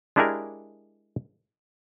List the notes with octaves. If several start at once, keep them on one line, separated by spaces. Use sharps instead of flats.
G#3 D4 E4 G4 G#4 A#4